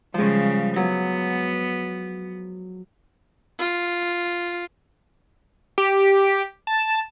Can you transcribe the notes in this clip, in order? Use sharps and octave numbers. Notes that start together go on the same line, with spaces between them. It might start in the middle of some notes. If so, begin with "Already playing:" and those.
C#3 F3 G3 G#3
F#3 B3
F4
G4
A5